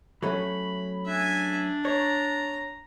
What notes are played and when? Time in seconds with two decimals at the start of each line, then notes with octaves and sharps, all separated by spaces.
0.23 F#3 A3 C#4 B5
1.06 D4 E5 G#5
1.85 C#5 A#5